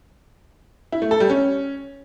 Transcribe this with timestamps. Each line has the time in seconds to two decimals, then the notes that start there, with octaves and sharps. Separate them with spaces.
0.92 E4
1.02 A3
1.11 A4
1.20 G3
1.30 C#4